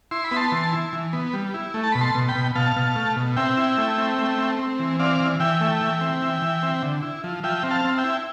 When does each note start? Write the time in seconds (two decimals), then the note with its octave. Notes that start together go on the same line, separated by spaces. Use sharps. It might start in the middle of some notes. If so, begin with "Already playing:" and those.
0.11 E4 C6
0.24 B5
0.31 B3 A5 C6
0.52 E3
0.73 E4
0.93 E3
1.13 B3
1.33 G3
1.54 E4
1.74 A3
1.84 A5
1.92 B2 B5
2.01 A5 C6
2.15 B2
2.28 G5 B5
2.35 B2
2.55 B2 F5 A5
2.76 B2
2.96 A3
3.16 B2
3.36 C4 E5 G5
3.57 E4
3.78 A3
3.98 C4
4.18 A3
4.38 C4
4.59 C4
4.79 E3
4.99 C4 D5 F5
5.20 E3
5.40 E3 E5 G5
5.61 A3
5.81 E3
6.01 C4
6.22 E3
6.42 E3
6.63 C4
6.83 D3
7.03 E4
7.24 F3
7.44 F3 E5 G5
7.63 C4
7.71 F5 A5
7.85 C4
7.98 E5 G5
8.04 E4